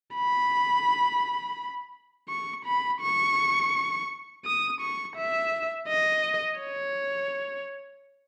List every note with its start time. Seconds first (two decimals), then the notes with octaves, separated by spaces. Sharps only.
0.15 B5
2.29 C#6
2.66 B5
3.01 C#6
4.45 D#6
4.81 C#6
5.17 E5
5.89 D#5
6.60 C#5